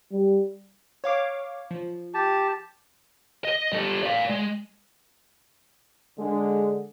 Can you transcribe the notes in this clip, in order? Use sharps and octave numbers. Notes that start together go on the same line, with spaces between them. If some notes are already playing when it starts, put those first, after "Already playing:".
G3
C#5 F5 D6
F3
G4 A5
D#5
G3 A4
D5 F5
G#3
D3 G#3